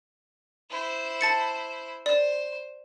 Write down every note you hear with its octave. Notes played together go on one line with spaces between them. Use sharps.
E4 C5
A5 A6 C#7
C5 D5